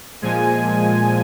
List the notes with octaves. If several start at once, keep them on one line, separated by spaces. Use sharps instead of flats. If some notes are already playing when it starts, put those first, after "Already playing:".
A#2 F3 G#3 G#5